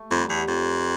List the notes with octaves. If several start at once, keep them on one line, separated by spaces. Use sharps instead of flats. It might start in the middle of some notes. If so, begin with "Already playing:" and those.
Already playing: A3
F2 G3
F#3
E2 G3
F2